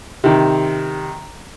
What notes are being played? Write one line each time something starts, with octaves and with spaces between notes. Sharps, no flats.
C3 D#3